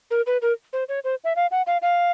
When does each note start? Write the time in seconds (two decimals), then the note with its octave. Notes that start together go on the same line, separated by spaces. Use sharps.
0.11 A#4
0.27 B4
0.42 A#4
0.73 C5
0.89 C#5
1.04 C5
1.24 E5
1.36 F5
1.51 F#5
1.67 F5
1.82 F5